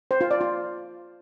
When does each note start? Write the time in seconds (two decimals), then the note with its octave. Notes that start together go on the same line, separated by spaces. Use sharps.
0.11 C5
0.21 F4
0.31 D5
0.41 F4